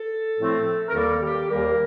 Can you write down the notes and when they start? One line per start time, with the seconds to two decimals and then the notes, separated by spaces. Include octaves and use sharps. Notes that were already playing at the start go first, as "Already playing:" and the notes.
Already playing: A4
0.37 A2 F3 A3 C4
0.88 A#4
0.93 D#2 D#3 G3 A#3 A4
1.22 G4
1.49 D#2 D#3 G3 A#3 A#4